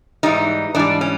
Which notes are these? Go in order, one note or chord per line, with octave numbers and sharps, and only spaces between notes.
G#2 E3 G3 D#4
G#2 E3 G3 D4
C#4